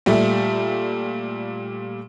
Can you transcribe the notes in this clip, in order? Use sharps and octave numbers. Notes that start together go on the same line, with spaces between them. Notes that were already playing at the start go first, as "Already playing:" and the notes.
A#2 G3 A3